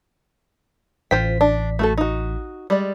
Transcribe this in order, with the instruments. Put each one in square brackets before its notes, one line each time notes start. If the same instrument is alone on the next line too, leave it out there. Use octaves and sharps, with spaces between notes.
[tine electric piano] A1 B6 [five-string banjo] F4 C5 G5
[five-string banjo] D4
A3 F#4 A4
D#4 F#4
G3 G#3 D5